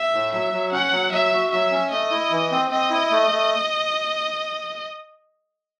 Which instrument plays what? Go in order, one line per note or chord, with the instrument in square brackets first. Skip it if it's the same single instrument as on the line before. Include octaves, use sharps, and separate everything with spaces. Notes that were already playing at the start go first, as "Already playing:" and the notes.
Already playing: [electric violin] E5
[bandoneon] A2
[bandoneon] F#3 [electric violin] E5
[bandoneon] F#3
[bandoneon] C#4 [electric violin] F#5
[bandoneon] F#3
[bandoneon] F#3 [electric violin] E5
[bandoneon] F#4
[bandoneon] F#3 [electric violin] E5
[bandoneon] C#4
[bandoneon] A3 [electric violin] D#5
[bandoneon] E4
E3
C4
[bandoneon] C4 [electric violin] D#5
[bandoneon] E4
A3
A3